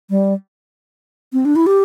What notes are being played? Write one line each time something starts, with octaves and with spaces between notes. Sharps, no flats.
G3
C4
D4
E4
G4